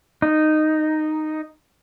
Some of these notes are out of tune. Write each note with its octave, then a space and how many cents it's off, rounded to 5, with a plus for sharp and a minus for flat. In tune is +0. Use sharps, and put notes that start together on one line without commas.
D#4 -10